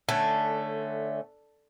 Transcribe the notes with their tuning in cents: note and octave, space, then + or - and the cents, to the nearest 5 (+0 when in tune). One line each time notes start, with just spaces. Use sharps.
D3 +15 A3 +0 C#4 +0